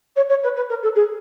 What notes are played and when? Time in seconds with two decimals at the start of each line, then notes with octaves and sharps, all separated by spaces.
0.16 C#5
0.29 C#5
0.43 B4
0.56 B4
0.69 A#4
0.82 A4
0.95 G#4